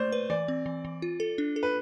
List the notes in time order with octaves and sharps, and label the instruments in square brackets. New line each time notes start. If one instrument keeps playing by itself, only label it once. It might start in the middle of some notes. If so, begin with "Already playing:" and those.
Already playing: [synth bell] A3 [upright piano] C5 D5
[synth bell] B4
[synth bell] E3 [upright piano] D5
[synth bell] C4
E3
E3
F4
A4
D4
A4
[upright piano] B4